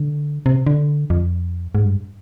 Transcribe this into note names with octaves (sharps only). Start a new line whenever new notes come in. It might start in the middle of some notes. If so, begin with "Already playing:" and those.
Already playing: D3
C3
D3
F2
G#2
G2